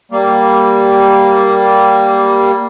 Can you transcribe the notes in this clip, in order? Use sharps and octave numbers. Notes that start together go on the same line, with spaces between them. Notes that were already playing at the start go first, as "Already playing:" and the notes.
G3 A#3